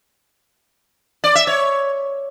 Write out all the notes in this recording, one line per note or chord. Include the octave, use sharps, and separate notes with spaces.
D5
E5
C#5